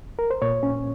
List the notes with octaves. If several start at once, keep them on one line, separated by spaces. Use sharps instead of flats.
A#4
C5
A#2 C#5
C#4